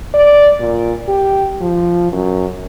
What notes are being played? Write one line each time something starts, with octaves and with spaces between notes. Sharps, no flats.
D5
A#2
G4
F3
F#2